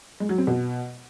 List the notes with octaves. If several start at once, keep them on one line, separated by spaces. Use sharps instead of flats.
G#3
F#3
C4
B2